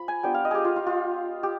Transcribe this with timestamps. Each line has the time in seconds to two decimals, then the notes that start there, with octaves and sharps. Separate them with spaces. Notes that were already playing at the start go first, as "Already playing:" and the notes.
Already playing: F3 F4 B5
0.08 G#5
0.23 G3 B3 D4 F4 G5
0.34 F5
0.45 D#5
0.51 G4 G#4
0.65 F4
0.76 F4
0.87 F4
1.43 G4